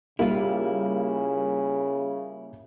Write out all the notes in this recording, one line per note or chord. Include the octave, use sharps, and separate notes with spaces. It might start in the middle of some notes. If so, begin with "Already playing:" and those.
C#3 G3 A#3 E4 F4